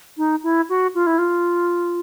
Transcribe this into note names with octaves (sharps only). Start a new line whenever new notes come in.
D#4
E4
F#4
F4
E4
F4